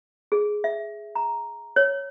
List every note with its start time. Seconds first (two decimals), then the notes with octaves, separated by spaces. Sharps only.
0.32 G#4
0.64 E5
1.15 A#5
1.76 C#5